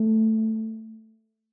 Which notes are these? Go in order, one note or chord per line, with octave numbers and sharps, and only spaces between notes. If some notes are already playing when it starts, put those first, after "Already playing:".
Already playing: A3